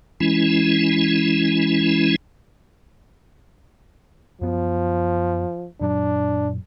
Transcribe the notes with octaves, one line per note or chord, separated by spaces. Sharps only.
E3 G#3 C#4 E4
F#2 F3 B3
F#2 A#2 F#3 D4